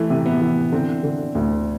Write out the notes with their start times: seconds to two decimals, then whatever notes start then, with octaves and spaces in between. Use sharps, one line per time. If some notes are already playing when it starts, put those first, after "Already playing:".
Already playing: E3 A3
0.10 C3
0.26 B3
0.41 E3
0.72 D3 C4
1.03 D3
1.35 D2